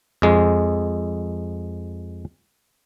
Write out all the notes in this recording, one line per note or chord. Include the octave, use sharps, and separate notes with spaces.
F2 G#3